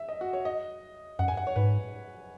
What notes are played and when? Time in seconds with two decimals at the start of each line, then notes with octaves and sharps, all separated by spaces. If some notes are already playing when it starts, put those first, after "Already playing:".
Already playing: E5
0.09 D#5
0.21 F#4
0.33 C#5
0.45 D#5
1.19 F#2 F#5
1.28 G#5
1.37 F#5
1.47 C#5
1.56 G#2 B4